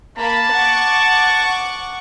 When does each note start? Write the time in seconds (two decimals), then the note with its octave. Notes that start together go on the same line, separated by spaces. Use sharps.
0.18 A#3 A5 B5
0.53 F#5 C#6 D6